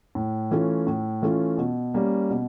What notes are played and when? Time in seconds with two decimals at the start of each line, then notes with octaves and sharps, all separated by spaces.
0.15 A2
0.51 E3 A3 C#4 F4
0.87 A2
1.22 E3 A3 C#4 F4
1.58 B2
1.94 G3 A#3 C#4
2.30 B2